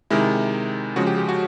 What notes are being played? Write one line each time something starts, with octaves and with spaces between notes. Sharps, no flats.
C3 D#3 G#3 E4
C#3 F3 G#3 F#4
G4
G4
F#4